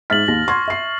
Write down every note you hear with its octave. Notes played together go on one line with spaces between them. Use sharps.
G#2 E5 F6 A6 B6 F#7
D#2 A#6
C6 C#6 G#6
E5 C7